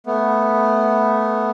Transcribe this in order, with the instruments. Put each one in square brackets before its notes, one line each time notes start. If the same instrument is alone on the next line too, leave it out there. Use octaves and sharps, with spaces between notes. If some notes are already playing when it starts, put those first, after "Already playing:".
[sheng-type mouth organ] A3 B3